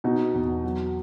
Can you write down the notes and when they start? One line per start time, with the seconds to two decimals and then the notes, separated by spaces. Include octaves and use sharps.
0.04 B2 D#4
0.34 E2
0.64 F#3